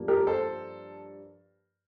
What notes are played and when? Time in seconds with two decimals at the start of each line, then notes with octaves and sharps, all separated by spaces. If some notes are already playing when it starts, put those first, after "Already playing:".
Already playing: G2 F3 A#3
0.08 G4 A#4
0.27 A4 C5